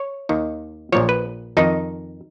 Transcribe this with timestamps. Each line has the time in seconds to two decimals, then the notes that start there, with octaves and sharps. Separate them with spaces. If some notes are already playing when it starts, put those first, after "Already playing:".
Already playing: C#5
0.29 D#2 D#3
0.92 A#1 A#2 F3 C#5
1.09 B4
1.57 F2 D#3 D#4